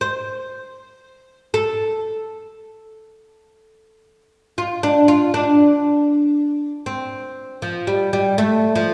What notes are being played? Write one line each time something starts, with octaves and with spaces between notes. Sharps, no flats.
C5
A4
F4
D4
F4
D4
C4
F3
G3
G3
A3
F3